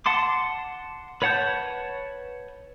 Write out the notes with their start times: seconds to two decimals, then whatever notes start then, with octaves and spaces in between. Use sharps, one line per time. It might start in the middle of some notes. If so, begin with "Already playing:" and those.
0.06 F#5 A5 C6 D6
1.22 B4 C#5 F#5 A5 G6